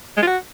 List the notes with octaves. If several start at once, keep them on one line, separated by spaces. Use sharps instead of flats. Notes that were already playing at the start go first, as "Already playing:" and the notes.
G#3
F4
F#4